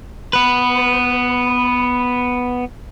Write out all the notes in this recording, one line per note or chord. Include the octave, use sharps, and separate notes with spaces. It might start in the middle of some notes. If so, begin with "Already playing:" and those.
B3 B4